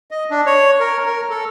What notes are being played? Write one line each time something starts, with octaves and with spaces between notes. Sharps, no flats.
D#5
D4
C#5
A#4
A#4
A4